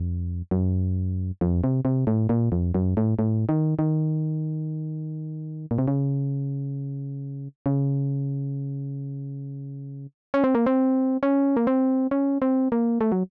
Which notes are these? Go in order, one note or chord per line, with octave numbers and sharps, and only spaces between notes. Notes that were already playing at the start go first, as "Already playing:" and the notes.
Already playing: F2
F#2
F2
C3
C3
A2
A#2
F2
F#2
A2
A2
D#3
D#3
A#2
C3
C#3
C#3
C#4
C4
A#3
C4
C#4
A#3
C4
C#4
C4
A#3
A3
F#3